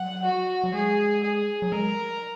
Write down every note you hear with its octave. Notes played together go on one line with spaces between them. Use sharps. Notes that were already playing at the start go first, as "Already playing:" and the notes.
Already playing: F#3 F#5
F#4
F#3
G#3 G#4
G#4
F#3
G#3 A#4